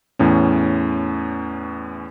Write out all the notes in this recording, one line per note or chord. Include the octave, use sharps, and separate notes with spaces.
E2 A2 C#4